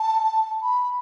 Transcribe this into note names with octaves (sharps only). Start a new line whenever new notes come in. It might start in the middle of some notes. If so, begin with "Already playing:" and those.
Already playing: A5
B5